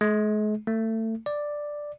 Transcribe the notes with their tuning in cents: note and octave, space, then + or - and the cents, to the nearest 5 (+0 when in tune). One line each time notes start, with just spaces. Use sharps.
G#3 +40
A3 +25
D5 +5